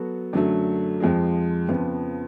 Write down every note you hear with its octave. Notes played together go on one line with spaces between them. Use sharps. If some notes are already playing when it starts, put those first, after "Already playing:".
Already playing: F#3 B3 F#4 A4
F#2 D3 F#3 A3
F2 F3 G#3
F2 C#3 F3 B3